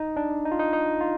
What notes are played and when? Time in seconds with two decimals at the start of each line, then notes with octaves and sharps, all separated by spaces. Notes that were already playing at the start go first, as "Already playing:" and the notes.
Already playing: D#4
0.16 D4
0.45 D#4
0.51 F4
0.59 D#4
0.73 D#4
1.01 F4